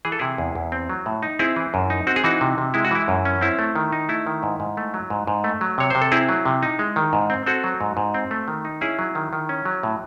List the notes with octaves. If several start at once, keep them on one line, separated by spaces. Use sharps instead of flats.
E3 G#4
A4
C3 E4 G#4
E2
E2
C4
F#3
A2
D#4
C4 E4 G#4
E3
F#2
D#4
C4 F#4
G#4
E3 D#4 F#4
C3
C3
G#3 E4
F#4
E3 E4
F#2
C#4
C4 E4
A3
D#3
D#4
A3 E4
D#3
G#2
G#2
A3
F#3
G#2
G#2
A3
F#3
C3 C#5
C3 C5
A4
C4 E4 G#4
F#3
C3
D#4
G#3
D#3
G#2
C4
C4 F#4 A4
F#3
G#2
G#2
C4
A3
D#3
D#4
C#4 E4 G#4
F#3
D#3
D#3
C#4
F#3
A2